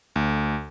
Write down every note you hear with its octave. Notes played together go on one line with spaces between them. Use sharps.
D2